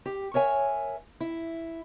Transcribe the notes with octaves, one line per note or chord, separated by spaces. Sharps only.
G4
A#4 C#5 E5 G#5
E4